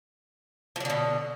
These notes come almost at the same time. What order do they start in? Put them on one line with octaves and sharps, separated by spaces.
F3 F#3 D3 B2